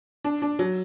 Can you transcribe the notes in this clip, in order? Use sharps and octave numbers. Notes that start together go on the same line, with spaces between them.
D4
D4
F#3